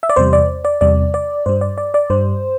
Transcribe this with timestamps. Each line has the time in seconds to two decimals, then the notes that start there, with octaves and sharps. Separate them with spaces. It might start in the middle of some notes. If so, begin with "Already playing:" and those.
0.03 E5
0.09 D5
0.16 E2 C3 G3 C5
0.33 D5
0.65 D5
0.81 E2 C3 G3 D5
1.14 D5
1.46 G2 G3 C5
1.61 D5
1.78 D5
1.94 D5
2.10 G2 G3 C5